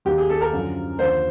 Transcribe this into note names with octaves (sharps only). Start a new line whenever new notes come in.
D#2 D#3 G4
G#4
A4
A#4
F#2 D3 F3
D#2 D3 F3 C5